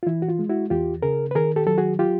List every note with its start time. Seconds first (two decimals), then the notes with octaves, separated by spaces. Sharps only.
0.03 F4
0.06 E3 E4
0.22 F#4
0.28 F4
0.39 G#3
0.49 E4 F#4
0.70 E2 F4 G4
1.02 C#3 G#4 A#4
1.31 B4
1.35 D#3 G#4 A#4
1.56 G4 A4
1.67 F#3 A4
1.78 F#4 G#4
1.99 F4 G4